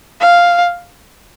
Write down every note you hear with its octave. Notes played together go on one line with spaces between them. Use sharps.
F5